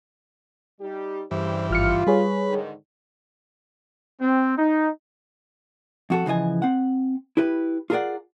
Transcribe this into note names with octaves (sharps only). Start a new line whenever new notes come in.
G3 D#4 G4
G2 C#3 E3 G3 C5
G#1 F4 F6 C#7
G3 G#4 B4 C#5
G#2 D3 D#3
C4
D#4
F2 F#4 A4
C#3 E3 F3 D#5 G#5
C4 F#5
E4 G4 B4
F4 G#4 A#4 C5 D5 F#5